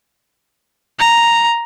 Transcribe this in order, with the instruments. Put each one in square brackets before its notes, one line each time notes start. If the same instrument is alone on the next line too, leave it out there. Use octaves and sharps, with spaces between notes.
[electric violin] A#5